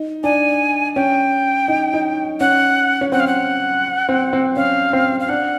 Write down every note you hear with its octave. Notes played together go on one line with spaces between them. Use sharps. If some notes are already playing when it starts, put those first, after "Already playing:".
Already playing: D#4
D4 G#5
C#4 G5
D#4
D#4
C#4 F#5
C#4
C4 F#5
F5
F#5
C4
C4
C#4 F5
C4
F5
D4 F#5